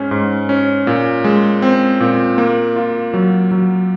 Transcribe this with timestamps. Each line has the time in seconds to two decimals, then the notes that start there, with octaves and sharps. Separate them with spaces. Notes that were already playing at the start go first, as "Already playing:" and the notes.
Already playing: G#2 C#4
0.11 G#2
0.49 C#4
0.87 A#2
1.24 G#3
1.62 C4
2.00 A#2
2.38 A#3
2.76 F4
3.14 F#3
3.51 F#3